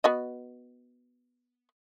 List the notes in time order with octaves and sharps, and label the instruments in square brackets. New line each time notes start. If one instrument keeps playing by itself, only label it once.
[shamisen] B3 F#4 D#5